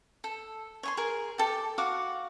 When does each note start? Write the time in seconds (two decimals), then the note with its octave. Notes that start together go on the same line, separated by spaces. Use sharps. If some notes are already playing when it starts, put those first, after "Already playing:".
0.24 A4
0.83 C#5 G#5 C6
0.97 G#4 A#4
1.38 G4 A4
1.78 F#4 F5 F#5 D6